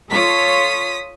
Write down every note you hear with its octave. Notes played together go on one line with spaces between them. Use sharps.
F4 A4 C#5 D#6 B6